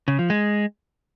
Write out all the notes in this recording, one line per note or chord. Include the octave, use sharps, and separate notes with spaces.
C#3
F3
G#3